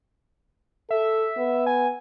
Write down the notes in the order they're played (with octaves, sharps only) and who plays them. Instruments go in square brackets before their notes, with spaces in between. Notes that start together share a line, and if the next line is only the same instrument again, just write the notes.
[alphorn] A4 [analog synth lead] E5
[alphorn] B3
[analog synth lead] G#5